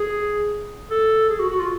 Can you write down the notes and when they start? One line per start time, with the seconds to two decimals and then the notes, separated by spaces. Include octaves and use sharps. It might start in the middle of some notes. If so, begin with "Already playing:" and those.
Already playing: G#4
0.91 A4
1.30 G#4
1.39 F#4
1.50 F#4
1.60 F4